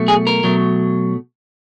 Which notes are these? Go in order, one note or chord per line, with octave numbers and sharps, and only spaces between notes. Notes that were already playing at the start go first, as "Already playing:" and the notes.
Already playing: B2 F#3 A3
G#4
A#4
B2 F#3 A3